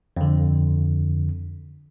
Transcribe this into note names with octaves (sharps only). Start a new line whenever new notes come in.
F2 D3